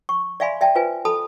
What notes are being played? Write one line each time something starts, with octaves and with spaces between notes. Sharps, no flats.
C#6
D5 E5 F5 G#5 B5 C6
D5 E5 G5 A5
F4 B4 C5 E5 G#5
A4 A5 B5 D#6